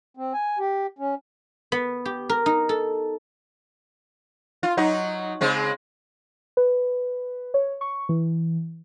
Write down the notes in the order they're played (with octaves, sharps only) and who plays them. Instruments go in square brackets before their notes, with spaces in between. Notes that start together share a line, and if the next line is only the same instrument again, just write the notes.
[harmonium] C4
G#5
G4
C#4
[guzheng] B3
G4
A#4
D#4
A4
[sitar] F4
F#3 D#4 F#4
C#3 G#3 C4
[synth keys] B4
C#5
C#6
E3